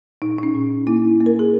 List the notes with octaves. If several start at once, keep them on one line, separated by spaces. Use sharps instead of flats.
A#2 D#4
D#4
C#4
A#2
A#3 E4
A#3
A#4
G#4